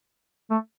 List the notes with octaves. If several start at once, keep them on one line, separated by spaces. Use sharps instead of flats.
A3